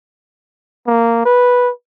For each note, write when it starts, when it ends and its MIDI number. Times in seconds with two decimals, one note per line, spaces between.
0.87 1.25 58
1.25 1.71 71